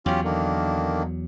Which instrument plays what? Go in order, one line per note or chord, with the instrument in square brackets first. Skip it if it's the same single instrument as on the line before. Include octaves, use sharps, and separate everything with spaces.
[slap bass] E2 F#3 [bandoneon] C#4 F4 G4
[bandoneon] D3 D#3 A#3